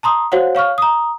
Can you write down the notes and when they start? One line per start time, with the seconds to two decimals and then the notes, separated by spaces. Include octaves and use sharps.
0.03 A5 A#5 C6 D#6
0.32 F#4 C5 C#5 F5 F#5
0.55 C#5 F5 C#6 F6
0.78 A#5 D#6